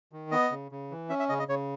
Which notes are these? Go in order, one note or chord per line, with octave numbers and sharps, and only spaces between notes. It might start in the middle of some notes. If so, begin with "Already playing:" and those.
D#3
B3 D#5
C#3
C#3
E3
C#4 E5
E5
C#3 D#5
D#5
C#3 C#5